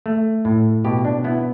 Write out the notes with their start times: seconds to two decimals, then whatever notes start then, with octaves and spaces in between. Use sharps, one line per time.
0.06 A3
0.45 A2
0.85 B2 G4
1.05 D4
1.24 B3 E4